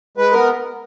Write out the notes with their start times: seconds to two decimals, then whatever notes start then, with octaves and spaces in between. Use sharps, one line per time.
0.17 G#3 B4
0.32 B3 A#4